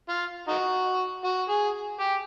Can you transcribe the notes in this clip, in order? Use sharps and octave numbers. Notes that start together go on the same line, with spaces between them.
F4
D#4 F#4
F#4
G#4
G4